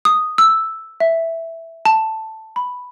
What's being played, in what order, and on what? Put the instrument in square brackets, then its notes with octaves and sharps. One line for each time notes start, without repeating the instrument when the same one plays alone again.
[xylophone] D#6
E6
E5
A5
B5